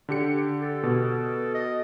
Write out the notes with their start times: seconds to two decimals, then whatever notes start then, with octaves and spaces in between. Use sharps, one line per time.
0.09 D3 G4 C#7
0.61 A4
0.83 B2
1.54 D#5